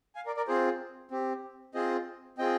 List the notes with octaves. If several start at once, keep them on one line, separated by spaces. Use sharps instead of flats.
F5 G#5
A#4 D5
A#4 D5
C4 F4 G#4 C5
C4 G4
C4 F4 G#4 C5 D#5
C4 F4 G#4 D#5 G5